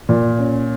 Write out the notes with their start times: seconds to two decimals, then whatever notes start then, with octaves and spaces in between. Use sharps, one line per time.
0.09 A#2
0.39 C#4